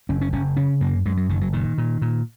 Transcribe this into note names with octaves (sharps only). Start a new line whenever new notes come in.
F#1 C#4
C#4
F#1 C#4
C#3 C#4
F#2 A#3
F#2 G#3
F#3
F#1 D#3
F#3
A#2 D#3
A#2
A#2